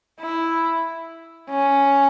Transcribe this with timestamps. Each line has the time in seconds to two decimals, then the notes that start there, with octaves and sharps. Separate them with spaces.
0.21 E4
1.50 C#4